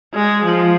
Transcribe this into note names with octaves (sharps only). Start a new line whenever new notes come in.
G#3
F3